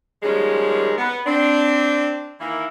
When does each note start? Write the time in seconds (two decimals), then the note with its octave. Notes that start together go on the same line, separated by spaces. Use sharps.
0.23 D#3 F3 G3 G#3 A#3 C#4
0.97 B3
1.26 C4 D4
2.40 D#3 E3 A#3 E4